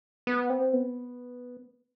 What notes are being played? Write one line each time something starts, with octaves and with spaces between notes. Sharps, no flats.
B3
C4
B3